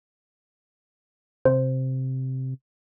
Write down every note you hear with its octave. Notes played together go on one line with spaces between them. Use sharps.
C3 C5